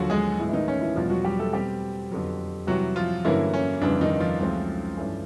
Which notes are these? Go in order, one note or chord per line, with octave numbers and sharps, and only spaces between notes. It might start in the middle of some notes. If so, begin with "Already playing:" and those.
Already playing: D#2 D3 F3 F#3 F#4
G#3 G#4
A2 E3 G#3 B3
E4
D#3 D#4
C#4
E3 E4
E2 B2 F3 G3 F4
F#3 F#4
G3 G4
A3 A4
B2 G3 C4 G4
F2 D3 F#3 B3
C3 E3 F#3 G3 F#4
F3 F4
G2 D3 E3 F#3 A#3 C#4 E4
C#4
F2 C#3 E3 G3 B3 D4
D#3 D#4
F3 F4
C#2 C#3 F#3 A3 C4
G2 E3 A3 C#4